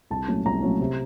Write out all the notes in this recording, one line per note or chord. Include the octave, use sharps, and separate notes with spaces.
C2 A5
A#2 F#3 A3 C#4
C2 A#5
A#2 F#3 A3 C#4
C3